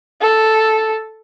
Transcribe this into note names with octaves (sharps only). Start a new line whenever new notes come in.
A4